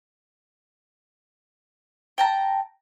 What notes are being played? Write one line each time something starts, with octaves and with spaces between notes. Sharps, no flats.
G5 A5 A#5